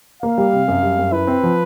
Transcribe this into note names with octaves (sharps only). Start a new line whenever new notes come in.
A#3 F5
G3
C3
F#2
G3
F#2
E4 B4
C4
F3